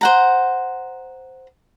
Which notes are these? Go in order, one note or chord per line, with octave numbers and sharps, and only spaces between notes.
C5 F#5 A#5